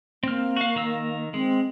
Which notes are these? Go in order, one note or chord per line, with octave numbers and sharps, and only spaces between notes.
A#3 C4 F6
F#4 F5
D#3 A#4 E6
G#3 C4